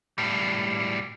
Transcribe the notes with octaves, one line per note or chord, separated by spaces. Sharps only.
A2 G3